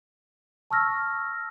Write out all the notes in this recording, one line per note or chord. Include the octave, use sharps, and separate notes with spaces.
A5 C#6 E6 F6 A#6